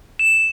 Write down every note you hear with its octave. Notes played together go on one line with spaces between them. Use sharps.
E7